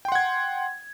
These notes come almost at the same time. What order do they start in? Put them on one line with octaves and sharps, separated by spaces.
G5 C6 F#5 G#6